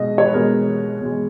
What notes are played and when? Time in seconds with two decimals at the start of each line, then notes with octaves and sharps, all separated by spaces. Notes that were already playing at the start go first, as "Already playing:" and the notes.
Already playing: B2 G#3 D#5
0.18 C#5
0.26 B4
0.33 B2 G#3 A#4
1.01 B2 G#3